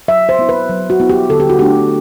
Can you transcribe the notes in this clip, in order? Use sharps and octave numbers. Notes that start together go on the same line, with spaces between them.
F#3 E5
C5
B3 E4
B4
F#3
F#4
B3 E4
G4
D3 A4
G4
F#4
A3 D4 G4